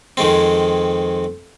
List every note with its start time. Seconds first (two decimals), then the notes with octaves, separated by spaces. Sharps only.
0.17 F2 D#3 G#3 C4